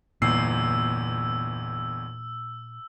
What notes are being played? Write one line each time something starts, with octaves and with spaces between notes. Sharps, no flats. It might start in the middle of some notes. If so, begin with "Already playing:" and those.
G1 E2 A#2 E6 C7